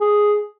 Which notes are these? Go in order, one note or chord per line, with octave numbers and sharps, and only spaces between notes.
G#4